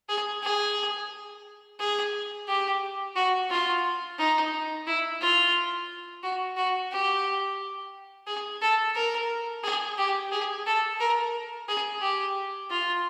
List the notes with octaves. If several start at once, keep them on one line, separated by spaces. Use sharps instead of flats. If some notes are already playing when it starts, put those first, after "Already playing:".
G#4
G#4
G#4
G4
F#4
F4
D#4
E4
F4
F#4
F#4
G4
G#4
A4
A#4
G#4
G4
G#4
A4
A#4
G#4
G4
F4